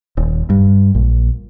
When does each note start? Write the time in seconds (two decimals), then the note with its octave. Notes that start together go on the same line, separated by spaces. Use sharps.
0.17 D#1
0.50 G2
0.95 A#1